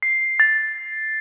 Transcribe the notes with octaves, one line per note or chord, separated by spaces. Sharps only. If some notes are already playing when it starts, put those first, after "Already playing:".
C7
A6